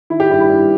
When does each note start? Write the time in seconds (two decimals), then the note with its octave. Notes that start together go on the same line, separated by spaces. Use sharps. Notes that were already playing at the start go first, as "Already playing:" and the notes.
0.10 D#3 E4
0.20 G4
0.30 G2 E4
0.40 E4
0.50 G2